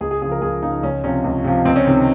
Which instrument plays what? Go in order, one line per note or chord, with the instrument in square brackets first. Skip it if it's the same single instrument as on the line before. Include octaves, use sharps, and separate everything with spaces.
[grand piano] C#2 G#4
G#4
C#3 F3 G#4
A#4
C#2 G#4
C#3 F3 D#4
C#2 C#4
C3 F3 C#4
C#2
C3 F3
C#2 C4
C#4
C3 D#3 C4